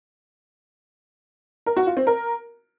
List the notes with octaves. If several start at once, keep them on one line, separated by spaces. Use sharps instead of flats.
A#4
F#4
F4
C4
A#4